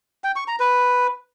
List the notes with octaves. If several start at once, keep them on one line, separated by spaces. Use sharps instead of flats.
G5
C#6
A#5
B4